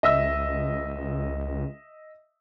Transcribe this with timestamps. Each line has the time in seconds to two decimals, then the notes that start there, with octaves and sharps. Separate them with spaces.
0.03 C#2 D#5 E5 E6